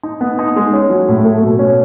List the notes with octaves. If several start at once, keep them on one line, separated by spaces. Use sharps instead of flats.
D#4
B3
D#4
G#3
C#4
F#3
A2
A3
B2
C#4